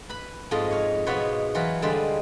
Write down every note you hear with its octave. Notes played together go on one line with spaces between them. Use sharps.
B4 B5
F2 G#2 F3 F4 D#5
C#5 F5
G#2 B2 B3 F4 B4 C#5
E3 F#3 F4 A#4 B4
D3 G3 G#3 F4 B4 C5